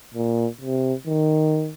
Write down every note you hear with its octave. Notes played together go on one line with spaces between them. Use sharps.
A#2
C3
D#3